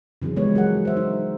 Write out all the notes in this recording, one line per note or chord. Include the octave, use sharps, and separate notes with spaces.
C#3 E3 F#3 C4 G#4
F3 G#3 B3 G4 B4 C#5
F#3 G#4 A#4 F#5
C5 E5
D#4